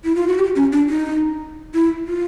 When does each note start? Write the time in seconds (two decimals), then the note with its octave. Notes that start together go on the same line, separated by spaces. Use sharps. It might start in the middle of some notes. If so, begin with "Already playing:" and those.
0.04 E4
0.16 F4
0.27 F#4
0.39 G4
0.56 C#4
0.72 D4
0.89 D#4
1.74 E4
2.08 F4